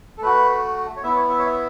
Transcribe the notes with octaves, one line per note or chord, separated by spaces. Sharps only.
A4
A3 F#4 B4
C#5
B3 E4 E5
C#5
E5
C#5
E5